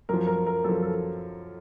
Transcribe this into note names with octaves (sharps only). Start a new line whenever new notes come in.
F#2 F3 A#4
A#4
A#4
F#2 F3 A4
A4